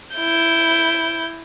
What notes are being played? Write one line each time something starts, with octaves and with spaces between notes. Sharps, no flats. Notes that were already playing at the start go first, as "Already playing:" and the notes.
E4 G6